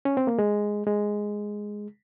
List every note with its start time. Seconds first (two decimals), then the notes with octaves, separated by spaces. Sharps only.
0.05 C#4
0.17 C4
0.27 A#3
0.39 G#3
0.87 G#3